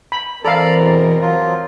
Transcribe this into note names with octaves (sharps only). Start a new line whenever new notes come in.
B5
E3 C4 A4 A#4 D5 F5 A#5 B5
E2 B2
F3 F#3 F4